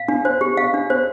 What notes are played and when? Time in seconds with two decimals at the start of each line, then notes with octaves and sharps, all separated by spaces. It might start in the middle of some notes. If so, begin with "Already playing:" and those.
Already playing: F5
0.08 D4
0.25 C5
0.41 G4
0.57 F5
0.74 D4
0.90 C5